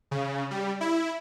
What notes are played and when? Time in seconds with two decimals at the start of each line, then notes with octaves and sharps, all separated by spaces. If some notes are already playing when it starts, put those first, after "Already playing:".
0.11 C#3
0.51 G3
0.81 E4